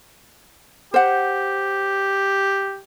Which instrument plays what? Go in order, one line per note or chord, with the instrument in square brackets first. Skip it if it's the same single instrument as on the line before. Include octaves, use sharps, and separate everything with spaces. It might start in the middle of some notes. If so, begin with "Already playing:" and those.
[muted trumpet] G4 [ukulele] C5 F#5